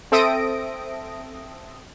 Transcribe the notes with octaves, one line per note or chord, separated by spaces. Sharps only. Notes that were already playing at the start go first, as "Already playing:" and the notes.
C4 A4 E5 D#6 A#6 D7